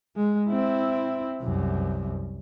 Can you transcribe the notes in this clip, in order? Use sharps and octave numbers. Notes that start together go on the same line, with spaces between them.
G#3
C4 E4
C2 F#2